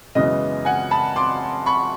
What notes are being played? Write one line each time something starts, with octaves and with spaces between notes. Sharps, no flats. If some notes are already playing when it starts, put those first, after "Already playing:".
F#2 C#3 E3 G#3 B3 D#5
F#5 G#5
A5 B5
C6 D6
B5 C#6